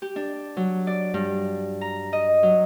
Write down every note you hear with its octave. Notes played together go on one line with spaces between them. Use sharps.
G4
D4
F#3
D5
G2
A#5
D#5
F#3